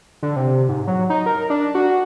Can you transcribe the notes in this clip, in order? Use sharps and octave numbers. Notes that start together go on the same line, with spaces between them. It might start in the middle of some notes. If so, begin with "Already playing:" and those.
D3
C3
G#2
F#3
D#4
A#4
D4
F#4